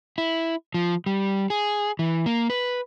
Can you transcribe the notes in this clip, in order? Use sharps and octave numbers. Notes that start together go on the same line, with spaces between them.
E4
F3
G3
G#4
E3
A#3
B4